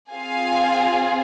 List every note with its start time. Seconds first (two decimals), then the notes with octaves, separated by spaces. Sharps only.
0.11 C4 F4 G#4 F5 G#5